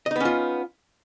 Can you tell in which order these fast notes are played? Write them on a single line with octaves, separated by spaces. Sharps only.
D#5 D#4 B3 C#4 F4